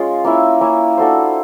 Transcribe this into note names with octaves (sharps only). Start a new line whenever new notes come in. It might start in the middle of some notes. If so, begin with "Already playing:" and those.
Already playing: G#3 C#4 F4
A#3 C#4 E4
A#3 C#4 E4
D4 F#4 A4 C5